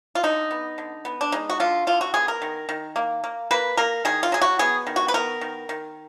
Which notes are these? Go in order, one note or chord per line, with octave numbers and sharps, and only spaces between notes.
F4
D3 D#4
B3
D3
B3
D4
G#3 D#4
F#4
D3 F4
D3 F4
F#4
B3 G#4
A#4
D#3
D#3
A#3
A#3
A#3 B4
A#3 A#4
D#3 G#4
F4
F#3 G#4
F#4
B3 G#4
D#3
F#4
B4
B3 A#4
D#3
D#3